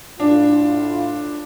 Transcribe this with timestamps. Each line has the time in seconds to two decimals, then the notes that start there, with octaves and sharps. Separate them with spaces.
0.20 A2 D4 F4